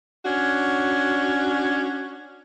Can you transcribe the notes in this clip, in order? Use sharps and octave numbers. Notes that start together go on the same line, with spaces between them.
C#4 D4 F#4